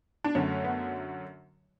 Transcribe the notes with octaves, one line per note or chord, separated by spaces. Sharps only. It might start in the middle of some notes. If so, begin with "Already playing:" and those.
D4
F#2 D3 F#3 A3 C#4
B3